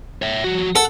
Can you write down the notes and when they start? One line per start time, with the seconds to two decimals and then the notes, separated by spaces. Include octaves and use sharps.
0.22 C#5 E5
0.44 F3 F#4
0.76 A4 F#5